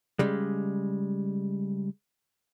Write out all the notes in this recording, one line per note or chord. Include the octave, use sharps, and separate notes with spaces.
C#3 G3 G#3